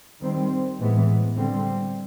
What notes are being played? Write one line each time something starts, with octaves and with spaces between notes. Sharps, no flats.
D#3 G3 C4
A2 E3 G#3 B3
D3 G3 C4